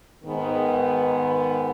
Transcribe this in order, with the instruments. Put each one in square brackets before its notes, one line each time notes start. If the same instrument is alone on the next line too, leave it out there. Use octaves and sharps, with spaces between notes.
[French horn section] G#2 D#3 B3